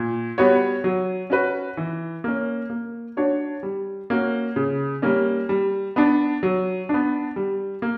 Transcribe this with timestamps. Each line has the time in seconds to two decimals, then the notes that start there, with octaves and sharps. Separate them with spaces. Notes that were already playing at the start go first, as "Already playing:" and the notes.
Already playing: A#2
0.38 G3 B3 F#4 C#5
0.84 F#3
1.30 C#4 F#4 B4
1.77 E3
2.24 A#3 C#4
2.70 A#3
3.17 D4 F#4 C#5
3.63 G3
4.10 A#3 C#4 F#4
4.56 C#3
5.02 G3 A#3 C#4
5.49 G3
5.96 B3 D4
6.43 F#3
6.89 B3 D4
7.36 G3
7.82 A#3